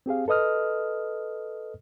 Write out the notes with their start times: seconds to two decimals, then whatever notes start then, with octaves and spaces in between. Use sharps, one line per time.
0.06 C4 G4 G#4 F5
0.28 A4 B4 D#5 D#6 F6